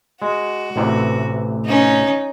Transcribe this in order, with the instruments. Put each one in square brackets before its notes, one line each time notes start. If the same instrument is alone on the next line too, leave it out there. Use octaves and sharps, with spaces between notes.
[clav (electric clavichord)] G#3 [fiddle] F#4
[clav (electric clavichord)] A1 C3 E3
[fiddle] C#4 D#4